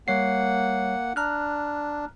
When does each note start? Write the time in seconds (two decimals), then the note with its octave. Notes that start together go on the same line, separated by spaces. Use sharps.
0.08 G3 A#3 C#5 F#5 C7
1.16 D4 A#5 F6 F#6